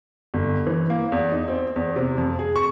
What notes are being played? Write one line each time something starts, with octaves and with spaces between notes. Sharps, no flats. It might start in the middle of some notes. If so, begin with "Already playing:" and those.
G1
E3
A#3
E2
D#4
C4
E2
C3
F2
G#4
C#6